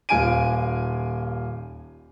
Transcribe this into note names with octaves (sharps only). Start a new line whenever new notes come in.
D#1 F4 G#5 D7 D#7